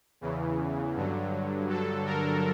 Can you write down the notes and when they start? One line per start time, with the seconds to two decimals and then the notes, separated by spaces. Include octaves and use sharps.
0.21 E2 C#3 E3
0.95 G2 D3 F#3
1.70 G2 D3 F#3 A4
2.06 A#4